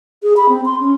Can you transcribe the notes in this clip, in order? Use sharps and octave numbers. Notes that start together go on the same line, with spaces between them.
G#4
B5
C4
C6
C#4